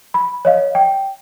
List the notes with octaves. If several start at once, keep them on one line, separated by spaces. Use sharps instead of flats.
B5
C#5 D#5 F5
G5